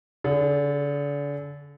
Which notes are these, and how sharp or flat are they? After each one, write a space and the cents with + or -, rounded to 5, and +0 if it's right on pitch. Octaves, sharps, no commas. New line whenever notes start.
D3 -35 G#4 +0